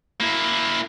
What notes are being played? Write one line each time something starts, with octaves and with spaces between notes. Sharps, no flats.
A#3 E4